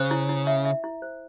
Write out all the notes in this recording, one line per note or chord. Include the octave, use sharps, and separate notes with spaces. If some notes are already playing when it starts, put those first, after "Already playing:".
Already playing: C#3 C5
E4
E4
E5
E5
E4
C5